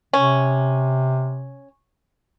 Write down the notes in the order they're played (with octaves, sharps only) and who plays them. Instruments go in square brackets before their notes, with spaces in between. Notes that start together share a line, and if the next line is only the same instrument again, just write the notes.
[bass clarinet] C3 [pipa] C#4